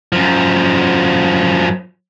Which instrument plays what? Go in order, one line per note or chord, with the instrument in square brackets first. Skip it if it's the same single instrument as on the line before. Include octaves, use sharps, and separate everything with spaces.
[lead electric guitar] F#2 F3